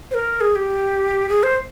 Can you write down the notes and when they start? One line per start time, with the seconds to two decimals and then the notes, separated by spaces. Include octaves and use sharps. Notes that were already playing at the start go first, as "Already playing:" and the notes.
0.11 C5
0.14 A#4
0.41 G#4
0.56 G4
1.29 G#4
1.43 C5